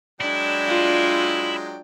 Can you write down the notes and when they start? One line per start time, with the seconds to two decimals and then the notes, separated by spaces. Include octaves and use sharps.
0.21 F#3 G#3 D4 E4 G5
0.67 F4